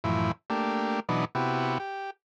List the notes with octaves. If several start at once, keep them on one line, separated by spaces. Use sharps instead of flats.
F#2 A2 E3 F3 E4
A3 A#3 D4 G4
B2 E3 F#3 D4 D#4 B4
C3 B3 E4 F#4 G4
G4